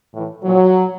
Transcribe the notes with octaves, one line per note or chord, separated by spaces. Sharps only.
A2 E3
A#2 F3 F#3